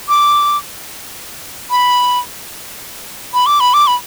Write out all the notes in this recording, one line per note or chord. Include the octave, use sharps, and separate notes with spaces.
D6
B5
B5
D6
B5
D6
B5